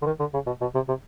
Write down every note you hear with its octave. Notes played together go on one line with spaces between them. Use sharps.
D3
D#3
D3
C#3
B2
B2
C3
C3